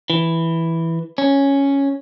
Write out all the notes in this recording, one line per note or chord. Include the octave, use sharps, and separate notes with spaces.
E3
C#4